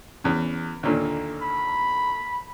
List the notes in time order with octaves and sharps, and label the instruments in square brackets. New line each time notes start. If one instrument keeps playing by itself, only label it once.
[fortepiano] E2 C#4
D#2 A#2 D3
[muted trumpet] B5